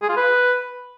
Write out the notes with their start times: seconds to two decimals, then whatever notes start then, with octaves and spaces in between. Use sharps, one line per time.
0.02 G#4
0.09 F4
0.17 B4